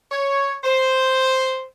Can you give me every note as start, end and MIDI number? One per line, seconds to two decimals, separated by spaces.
0.11 0.56 73
0.64 1.66 72